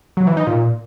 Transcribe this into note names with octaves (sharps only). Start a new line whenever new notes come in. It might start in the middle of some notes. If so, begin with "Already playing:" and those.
F#3
E3
D#4
A#2